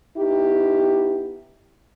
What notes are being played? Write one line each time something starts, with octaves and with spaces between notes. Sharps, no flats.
B3 D#4 E4 G4